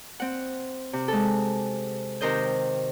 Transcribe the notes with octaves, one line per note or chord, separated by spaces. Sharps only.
C4 F#5
C3
G#3 A4
C3 D#3 A#4 C5 D#5 G6